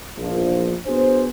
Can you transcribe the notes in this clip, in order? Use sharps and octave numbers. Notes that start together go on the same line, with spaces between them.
A#1 E2 F3
B3 D4 F#4 G#4 C5